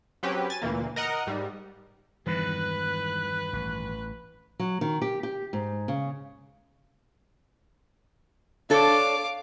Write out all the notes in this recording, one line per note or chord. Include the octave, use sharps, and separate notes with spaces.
F#3 C4 C#4 G4 B4
G#5 A6
D2 A#2 E3 A#3
A#4 D#5 F#5 A#5
G#2 G3
E2 G2 D#3 E3 G3 G#3 B4 F#6
A1
F#3
D#3
G4
G4
G#2
C#3
D4 A4 C#5 F5 D6